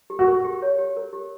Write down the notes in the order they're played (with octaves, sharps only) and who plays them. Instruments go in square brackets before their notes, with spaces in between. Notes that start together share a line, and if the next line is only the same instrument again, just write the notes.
[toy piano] G4
[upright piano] F#4
[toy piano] A#4
G4
C#5
G4
A#4
G4